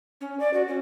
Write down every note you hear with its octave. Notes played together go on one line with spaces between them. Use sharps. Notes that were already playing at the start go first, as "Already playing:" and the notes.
C#4
D5
F#4
C#4